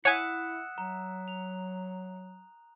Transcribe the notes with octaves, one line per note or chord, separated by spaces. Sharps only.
E4 C#5 E5 F#5 G#5 D#6 F#6 E7
F#3 A#5
F7